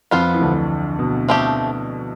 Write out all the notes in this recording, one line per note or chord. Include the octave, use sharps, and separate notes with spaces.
F2 F3 B3 F4 C5
E3
D2 D3
B2
F3 A3 C4 G4